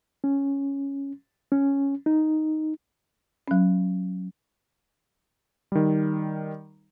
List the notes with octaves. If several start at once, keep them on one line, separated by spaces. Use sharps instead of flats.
C#4
C#4
D#4
F#3 C#4
D#3 G3